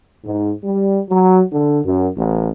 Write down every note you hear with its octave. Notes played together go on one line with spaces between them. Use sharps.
G#2
G3
F#3
D3
F#2
A1